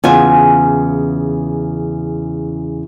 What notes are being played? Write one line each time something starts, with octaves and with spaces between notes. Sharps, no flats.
E2 C#3 F4 G#5